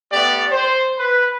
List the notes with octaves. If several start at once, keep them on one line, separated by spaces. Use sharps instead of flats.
A3 B3 G4 D5
C5
B4